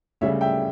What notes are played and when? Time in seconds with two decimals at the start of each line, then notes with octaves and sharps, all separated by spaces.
0.21 D2 C#3 G3 C#5 E5
0.41 E5 G5